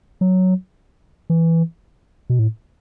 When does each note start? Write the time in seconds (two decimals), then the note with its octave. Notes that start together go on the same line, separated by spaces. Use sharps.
0.21 F#3
1.30 E3
2.30 B2
2.39 A2